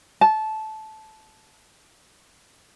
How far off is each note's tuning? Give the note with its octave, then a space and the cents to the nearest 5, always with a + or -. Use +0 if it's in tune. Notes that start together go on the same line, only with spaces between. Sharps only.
A5 -15